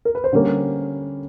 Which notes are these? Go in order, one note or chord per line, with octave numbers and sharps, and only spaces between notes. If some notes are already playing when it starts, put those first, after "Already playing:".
A#4
B4
C5
D3 G3 A#3 C#4 C#5